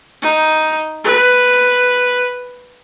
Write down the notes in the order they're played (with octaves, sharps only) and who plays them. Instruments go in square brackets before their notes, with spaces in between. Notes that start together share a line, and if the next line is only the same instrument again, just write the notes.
[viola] D#4
B4